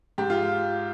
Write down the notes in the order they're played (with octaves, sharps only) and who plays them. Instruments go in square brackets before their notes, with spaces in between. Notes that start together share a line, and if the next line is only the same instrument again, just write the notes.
[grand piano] G#2 G4
F4